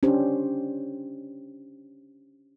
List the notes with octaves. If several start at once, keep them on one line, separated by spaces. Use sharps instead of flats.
C#4 D4 G4 C5